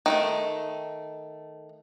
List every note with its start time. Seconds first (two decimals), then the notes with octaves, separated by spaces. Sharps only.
0.06 D#3 G#3 A3